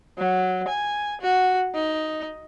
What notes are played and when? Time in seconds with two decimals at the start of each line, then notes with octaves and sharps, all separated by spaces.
0.19 F#3
0.68 G#5
1.21 F#4
1.75 D#4